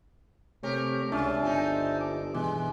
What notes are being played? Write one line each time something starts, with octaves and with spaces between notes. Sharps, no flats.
C3 A3 G4 A#4 C#5
C#2 C#4 D4 F4 E5 A5
G1 C4 D#4
D6
B2 E3 G#3